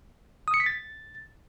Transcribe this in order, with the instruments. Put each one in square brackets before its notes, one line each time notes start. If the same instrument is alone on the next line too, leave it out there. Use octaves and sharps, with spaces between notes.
[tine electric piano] D#6
C#7
B6
A6